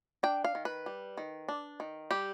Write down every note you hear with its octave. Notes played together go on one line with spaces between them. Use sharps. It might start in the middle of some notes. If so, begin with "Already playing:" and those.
D4 G5
F5
D#3
B4
G3
D#3
D4
D#3
G3 G4